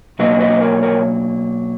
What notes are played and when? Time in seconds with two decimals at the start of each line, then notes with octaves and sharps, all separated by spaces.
0.19 B2 F#3 A#3 B4 D#5
0.40 B4 D#5
0.61 A#4 C#5
0.83 A#4 C#5